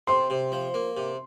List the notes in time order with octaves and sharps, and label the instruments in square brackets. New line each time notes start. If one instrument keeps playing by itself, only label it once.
[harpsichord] C3 [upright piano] C6
[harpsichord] C3
F3
A#3
C3